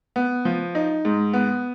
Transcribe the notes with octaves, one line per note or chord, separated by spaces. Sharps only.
B3
F3
D#4
G#2
B3